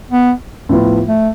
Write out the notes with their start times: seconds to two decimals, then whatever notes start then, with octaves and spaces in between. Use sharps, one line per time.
0.11 B3
0.69 A2 F3 B3 F4
1.09 A3